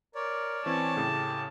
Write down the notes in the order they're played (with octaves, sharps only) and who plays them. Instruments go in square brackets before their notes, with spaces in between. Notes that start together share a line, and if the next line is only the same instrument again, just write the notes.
[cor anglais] A#4 [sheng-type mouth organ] C#5 D5
[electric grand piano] E3 C4 [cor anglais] C#4 [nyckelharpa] A5
[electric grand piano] A2 C#3 [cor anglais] G4